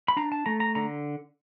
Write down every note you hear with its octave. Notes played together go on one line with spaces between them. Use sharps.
B5
D4 A#5
A5
A3 A#5
A#5
D3 A#5